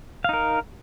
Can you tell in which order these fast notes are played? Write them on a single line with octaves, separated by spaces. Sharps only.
F5 D#4 A#4